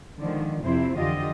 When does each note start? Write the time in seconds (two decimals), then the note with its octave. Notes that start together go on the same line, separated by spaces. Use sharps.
0.19 D3 D#3 F3 G#3
0.64 F2 C3 C4 E4 C5
0.97 F2 D3 E3 F4 G4 D#5